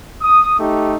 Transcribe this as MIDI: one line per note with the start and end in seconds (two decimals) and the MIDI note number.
0.22 0.55 87
0.60 0.95 57
0.60 0.95 63
0.60 0.95 67